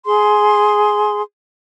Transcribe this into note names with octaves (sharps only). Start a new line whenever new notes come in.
G#4 C6